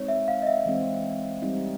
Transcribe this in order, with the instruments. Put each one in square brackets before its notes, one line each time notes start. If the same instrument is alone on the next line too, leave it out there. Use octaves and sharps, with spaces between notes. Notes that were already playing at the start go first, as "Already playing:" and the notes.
Already playing: [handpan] G#3 C4 D#4 [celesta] C#5
[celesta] E5
F5
D#5
E5
[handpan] E3 G#3 C4
G3 C4 D#4